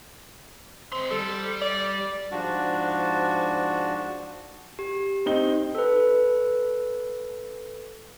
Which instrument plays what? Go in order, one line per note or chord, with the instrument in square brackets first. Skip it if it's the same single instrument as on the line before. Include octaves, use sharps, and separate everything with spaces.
[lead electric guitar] D#3 C6 [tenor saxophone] C4
[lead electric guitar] G3 [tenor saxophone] A4
[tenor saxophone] D5
[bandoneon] G#2 F3 D4 F#4
[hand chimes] G4
[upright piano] C4 D#4 G7
[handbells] A4 B4